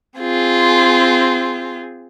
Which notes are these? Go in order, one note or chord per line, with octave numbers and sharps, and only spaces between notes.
C4 F4 G#4